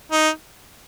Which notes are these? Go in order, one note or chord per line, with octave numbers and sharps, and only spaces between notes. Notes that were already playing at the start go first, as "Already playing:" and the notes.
D#4